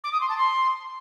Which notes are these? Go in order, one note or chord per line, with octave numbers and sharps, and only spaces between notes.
D6
D#6
C6
A5
C6